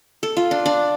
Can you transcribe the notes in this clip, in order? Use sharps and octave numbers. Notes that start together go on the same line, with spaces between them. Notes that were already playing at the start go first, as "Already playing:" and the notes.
A4
F4
D4
D4